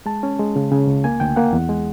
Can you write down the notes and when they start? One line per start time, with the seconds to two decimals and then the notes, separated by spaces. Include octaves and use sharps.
0.06 G#3 A5
0.23 C#4
0.39 G#3
0.56 C#3
0.72 C#3
0.87 C#2
1.04 A#3 G#5
1.20 D2 G5
1.36 A#3 F#5
1.53 E2
1.69 G#3